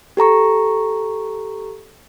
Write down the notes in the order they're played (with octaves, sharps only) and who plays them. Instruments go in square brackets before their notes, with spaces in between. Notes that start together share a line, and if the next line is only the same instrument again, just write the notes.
[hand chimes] G4 A4 A#5 C#6